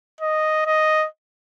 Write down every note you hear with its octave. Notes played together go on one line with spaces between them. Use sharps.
D#5
D#5